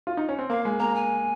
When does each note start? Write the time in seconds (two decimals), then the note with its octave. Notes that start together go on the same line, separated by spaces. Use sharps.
0.07 F4
0.17 D#4
0.29 C#4
0.39 C4
0.50 A#3 F5
0.65 G#3
0.80 A#3 A#5
0.95 G#5